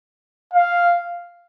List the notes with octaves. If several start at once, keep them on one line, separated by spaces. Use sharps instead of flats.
F5